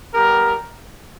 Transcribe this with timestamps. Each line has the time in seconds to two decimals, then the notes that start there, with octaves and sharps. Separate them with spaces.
0.14 G3 B3 G4 A#4